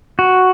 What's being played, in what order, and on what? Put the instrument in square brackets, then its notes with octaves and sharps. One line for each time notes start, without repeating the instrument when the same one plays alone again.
[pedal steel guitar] F#4